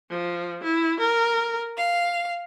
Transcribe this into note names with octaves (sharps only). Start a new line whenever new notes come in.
F3
E4
A#4
F5